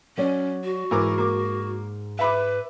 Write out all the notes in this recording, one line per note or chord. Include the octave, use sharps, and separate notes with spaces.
F#3 C#4 C#5 D5
F#4
G#2 E3 A#4 D6
A#3 D6
B4 E5 B5 D6